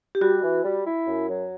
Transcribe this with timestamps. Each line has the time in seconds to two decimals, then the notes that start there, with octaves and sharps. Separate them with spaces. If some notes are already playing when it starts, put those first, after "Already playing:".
0.15 G4
0.21 G3 F#4
0.43 E3
0.64 G3
0.85 E4
1.06 F#2
1.27 F#3